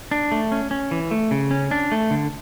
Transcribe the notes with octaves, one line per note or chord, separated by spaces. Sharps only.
D4
A3
C#4
C#4
E3
A3
C#3
C#4
D4
A3
D3